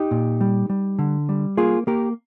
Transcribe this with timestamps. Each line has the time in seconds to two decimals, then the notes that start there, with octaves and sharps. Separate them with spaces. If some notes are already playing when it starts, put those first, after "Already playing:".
Already playing: D#4 G4
0.11 A#2
0.41 G3
0.70 G3
0.99 D3
1.29 G3
1.57 A#3 F4 G#4
1.87 A#3 G4 A#4